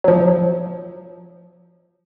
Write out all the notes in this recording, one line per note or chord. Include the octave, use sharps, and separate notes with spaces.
F3 F#3